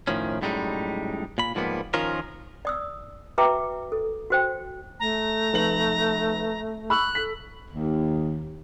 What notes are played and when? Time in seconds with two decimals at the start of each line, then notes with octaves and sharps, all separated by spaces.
0.07 A2 D#3 F3 C#4
0.42 F#2 A2 G3 G#3 D#4
1.38 A#2 B5
1.55 G#2 F3 G3 A#3 B3
1.94 D#3 F3 C#4 F4 A#4
2.65 D5 D#6 E6
3.38 F#4 B4 E5 G5 A#5 D6
3.92 A4
4.30 F#4 C5 G5
5.00 A3 A#5
5.53 F1 B4 F#7
6.90 B5 C#6 E6 F#6
7.15 A4 B6
7.71 D#2